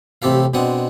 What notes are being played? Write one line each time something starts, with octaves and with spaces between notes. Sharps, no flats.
A1 C3 C4 G4 A4 F5
B2 G#3 C4 D4 F#5 D#6